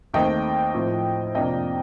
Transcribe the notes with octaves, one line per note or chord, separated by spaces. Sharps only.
D#2 D#3 A3 C4 D#5 G5
A2 F3 C4
F2 C3 F3 A#3 D4 D#5 G5